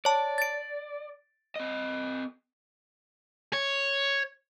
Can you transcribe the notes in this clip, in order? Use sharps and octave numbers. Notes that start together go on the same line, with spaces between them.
C#5 D5 A5
A6 D7
C4 D#5
C#5